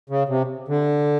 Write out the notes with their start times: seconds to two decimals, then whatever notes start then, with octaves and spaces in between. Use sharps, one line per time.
0.10 C#3
0.29 C3
0.68 D3